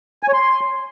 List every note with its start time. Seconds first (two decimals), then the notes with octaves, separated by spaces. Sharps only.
0.23 G#5
0.28 C#5
0.34 C6